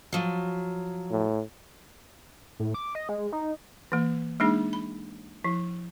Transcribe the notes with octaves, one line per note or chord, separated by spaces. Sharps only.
F3 F#3
A2
A2
D6
D#5
G#3
D#4
E3 A#3
G#3 A#3 D4 D#4 G#4
B5
F3 E4